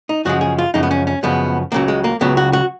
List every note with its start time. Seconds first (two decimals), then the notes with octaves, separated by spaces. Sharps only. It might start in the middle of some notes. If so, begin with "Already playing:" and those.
0.09 D#4
0.25 F#2 C#3 F3 G#3 F#4
0.41 G#4
0.58 F4
0.74 F#2 C#3 F3 G#3 D#4
0.83 B3
0.91 C#4
1.07 C#4
1.23 F#2 C#3 F3 G#3 B3
1.72 C#2 C#3 F#3 A#3
1.88 G#3
2.04 A#3
2.21 C#2 C#3 F#3 B3
2.37 F#4
2.53 F#4